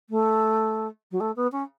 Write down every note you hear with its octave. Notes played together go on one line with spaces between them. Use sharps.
A3
F#3
A3
B3
C#4